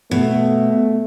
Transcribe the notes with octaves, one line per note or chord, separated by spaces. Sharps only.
B2 A3